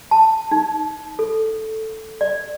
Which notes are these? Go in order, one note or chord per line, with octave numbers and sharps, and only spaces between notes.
A5
D#4
A4
D5